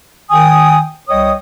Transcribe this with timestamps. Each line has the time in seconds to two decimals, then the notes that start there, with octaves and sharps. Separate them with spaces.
0.30 D#3 G5 G#5 D#6
1.09 C2 G3 C#5 D#5 G5 D#6